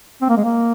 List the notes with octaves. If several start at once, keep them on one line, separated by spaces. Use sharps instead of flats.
C4
A#3
G#3
A#3